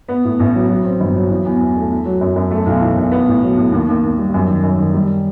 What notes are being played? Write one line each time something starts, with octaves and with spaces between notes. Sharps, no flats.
B3
A2
A1
F#3
F#3
C4
G1
F#3
E3
E2
E2
A3
E4
F#3
F#2
F#2
A3
B1
E3
B1
B3
A2
F#3
A2
D#2
D#2
D#2
G3
F#2
D#3
F#2
D#3
G3